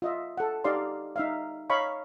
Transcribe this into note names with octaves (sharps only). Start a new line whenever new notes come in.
F4 D#5 E5
A4 F#5
D#4 G4 D5 D#5 F5 C6
D#4 E5 F5
C#5 D#5 F5 A#5 B5 C#6